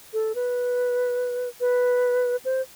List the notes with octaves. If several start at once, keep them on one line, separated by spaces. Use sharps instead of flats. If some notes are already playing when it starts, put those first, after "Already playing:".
A4
B4
B4
C5